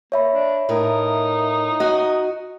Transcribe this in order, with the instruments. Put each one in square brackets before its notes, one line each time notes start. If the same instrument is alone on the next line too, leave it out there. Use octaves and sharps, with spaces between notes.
[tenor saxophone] A#3 [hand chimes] C#5 E5 B5
[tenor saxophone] D4
[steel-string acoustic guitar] A2 A#4 [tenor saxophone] D#4
[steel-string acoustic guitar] F#4 D#5